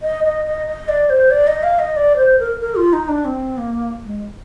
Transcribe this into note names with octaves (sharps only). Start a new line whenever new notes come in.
D#5
D#5
D#5
D#5
D5
C5
D5
D#5
F5
D#5
D5
C5
A#4
A#4
F4
D#4
D4
C4
A#3
G#3